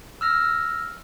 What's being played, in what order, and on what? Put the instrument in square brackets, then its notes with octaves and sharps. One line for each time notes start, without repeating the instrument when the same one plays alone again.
[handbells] E6 F6 A#6